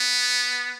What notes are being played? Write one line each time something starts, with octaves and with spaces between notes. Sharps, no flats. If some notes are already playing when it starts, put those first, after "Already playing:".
Already playing: B3